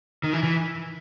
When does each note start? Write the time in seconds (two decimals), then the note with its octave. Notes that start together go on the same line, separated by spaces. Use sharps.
0.23 D#3
0.33 E3
0.43 E3